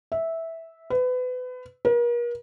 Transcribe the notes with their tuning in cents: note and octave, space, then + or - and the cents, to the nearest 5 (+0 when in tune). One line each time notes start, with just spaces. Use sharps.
E5 -10
B4 +30
A#4 +40